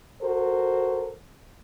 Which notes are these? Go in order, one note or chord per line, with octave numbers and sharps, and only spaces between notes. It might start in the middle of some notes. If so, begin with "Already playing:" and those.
F#4 A4 A#4 C5